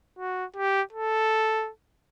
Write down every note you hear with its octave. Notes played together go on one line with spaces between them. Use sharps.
F#4
G4
A4